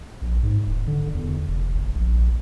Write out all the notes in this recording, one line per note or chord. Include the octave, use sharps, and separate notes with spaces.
A#1
G#2
D#1
D3
E2
F1
G1
A#1